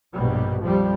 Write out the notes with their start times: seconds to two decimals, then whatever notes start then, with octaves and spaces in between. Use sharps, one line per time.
0.14 A#1 G2 B2 G3
0.62 F2 F3 G3